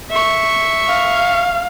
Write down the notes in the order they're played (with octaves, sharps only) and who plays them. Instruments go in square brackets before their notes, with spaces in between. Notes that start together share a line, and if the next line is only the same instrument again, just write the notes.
[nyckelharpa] E5 C#6
[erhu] F5